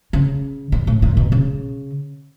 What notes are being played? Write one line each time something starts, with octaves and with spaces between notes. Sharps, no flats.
C#3
A#2
A2
A#2
B2
C#3